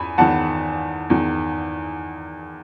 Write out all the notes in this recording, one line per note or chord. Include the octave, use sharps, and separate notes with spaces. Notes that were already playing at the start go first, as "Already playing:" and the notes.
Already playing: E2 G#5 B5
E2 D#3 F#5 A5
E2 D#3